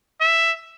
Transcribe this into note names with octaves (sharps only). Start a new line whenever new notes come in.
E5